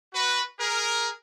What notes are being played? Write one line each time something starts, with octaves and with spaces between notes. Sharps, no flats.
F#4 B4
G#4 A#4